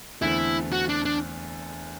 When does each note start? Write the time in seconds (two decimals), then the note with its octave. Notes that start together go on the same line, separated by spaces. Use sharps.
0.22 E2 D3 A3 C4 E4
0.73 F#4
0.89 D4
1.05 D4